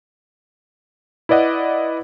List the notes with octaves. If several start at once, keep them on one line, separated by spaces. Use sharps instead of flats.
E4 B4 D5 D#5 F#5